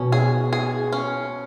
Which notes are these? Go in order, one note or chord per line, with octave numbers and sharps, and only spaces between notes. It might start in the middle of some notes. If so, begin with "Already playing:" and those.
Already playing: B2 C#4
G#4
G#4
C#4